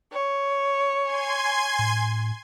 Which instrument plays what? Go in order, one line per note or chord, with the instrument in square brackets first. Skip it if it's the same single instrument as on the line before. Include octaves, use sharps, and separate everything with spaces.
[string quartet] C#5
[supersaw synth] G#5 C6 G#6
[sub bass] A2